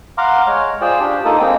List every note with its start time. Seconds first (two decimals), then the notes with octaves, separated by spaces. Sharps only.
0.18 F5 F#5 A#5 C6 D6 F6
0.47 G#3 C#5
0.81 F4 G#4 C5 D5 G5
1.00 D4 G4
1.25 A#3 D#4 F4 A4 D#6
1.40 G#3 A#3 C4 G5